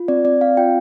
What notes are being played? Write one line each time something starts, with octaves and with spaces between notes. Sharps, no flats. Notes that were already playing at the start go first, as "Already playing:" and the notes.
Already playing: F4
C4 D5
C4 D5
C4 F5
F4 G5